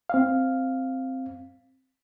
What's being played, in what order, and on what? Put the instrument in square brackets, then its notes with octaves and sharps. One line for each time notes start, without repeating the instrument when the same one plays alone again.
[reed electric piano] C4 F5